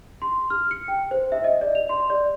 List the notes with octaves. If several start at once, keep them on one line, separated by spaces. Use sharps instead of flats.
C6
F6
C#7
G5
C5
E5
D#5
D5
F7
C6
D5